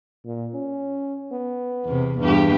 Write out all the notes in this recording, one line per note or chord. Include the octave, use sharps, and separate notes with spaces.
A#2
C#4
B3
E2 C3
E2 G2 G4